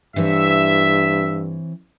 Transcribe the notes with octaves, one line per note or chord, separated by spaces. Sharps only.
G2 E3 C4 C#5 E5